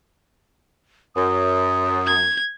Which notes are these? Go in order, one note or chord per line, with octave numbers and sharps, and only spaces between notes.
F#2 D#6
G#6